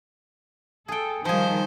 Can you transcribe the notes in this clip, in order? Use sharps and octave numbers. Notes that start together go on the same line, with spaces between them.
G#4 A4 G5
D#3 F3 G3 G#4 C5